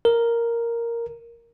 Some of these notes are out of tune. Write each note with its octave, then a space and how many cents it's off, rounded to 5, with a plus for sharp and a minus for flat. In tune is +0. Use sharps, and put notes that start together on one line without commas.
A#4 +0